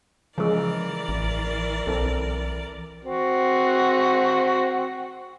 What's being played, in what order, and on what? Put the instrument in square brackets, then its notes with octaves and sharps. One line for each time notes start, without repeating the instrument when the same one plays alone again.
[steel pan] C#3 G#3 [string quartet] E3 A#4 D5 [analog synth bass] F3
[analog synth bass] A1
[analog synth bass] B1 [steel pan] C4 A4
[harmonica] C4 F#4